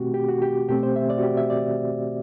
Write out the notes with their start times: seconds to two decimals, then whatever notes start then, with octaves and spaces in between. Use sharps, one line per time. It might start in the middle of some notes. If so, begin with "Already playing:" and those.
Already playing: B2 A3 C4 F#4 G4
0.14 G4
0.28 F#4
0.42 G4
0.68 B2 A3 C4 G4
0.83 C5
0.96 E5
1.10 D5
1.18 F#4
1.23 G4
1.37 E5
1.50 D5